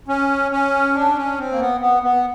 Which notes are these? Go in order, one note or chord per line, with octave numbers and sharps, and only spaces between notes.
C#4
C#4
D4
C#4
C4
A#3
B3
B3
B3